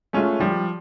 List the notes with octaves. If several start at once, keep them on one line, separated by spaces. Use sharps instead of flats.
G#3 A3 C#4 F4
F3 G3